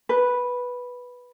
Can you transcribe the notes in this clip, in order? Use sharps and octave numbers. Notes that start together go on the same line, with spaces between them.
B4